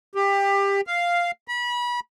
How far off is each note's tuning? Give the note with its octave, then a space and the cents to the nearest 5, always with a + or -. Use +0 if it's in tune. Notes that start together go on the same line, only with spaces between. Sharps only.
G4 +20
F5 -5
B5 -30